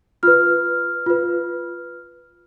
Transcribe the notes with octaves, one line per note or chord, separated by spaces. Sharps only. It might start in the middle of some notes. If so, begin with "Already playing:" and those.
F4 B4 F6
F4 B4